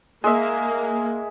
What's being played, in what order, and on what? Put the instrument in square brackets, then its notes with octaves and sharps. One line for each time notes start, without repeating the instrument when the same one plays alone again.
[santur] G#3 E5 [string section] A#3